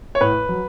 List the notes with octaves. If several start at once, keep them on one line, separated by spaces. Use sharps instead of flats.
C#5
A2 B4
F#3